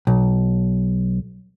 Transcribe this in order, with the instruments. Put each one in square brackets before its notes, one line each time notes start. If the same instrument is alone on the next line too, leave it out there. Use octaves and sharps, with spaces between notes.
[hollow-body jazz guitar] B1